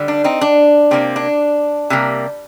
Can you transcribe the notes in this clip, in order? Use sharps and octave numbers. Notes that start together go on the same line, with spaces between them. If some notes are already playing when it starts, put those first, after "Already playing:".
Already playing: D3 G3
D4
C4 D#4
D4
C3 G3 A#3 C4
D4
C3 G3 A#3